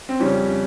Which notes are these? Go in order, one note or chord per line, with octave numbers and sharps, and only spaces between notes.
C4
F2 C#3 G3 C#4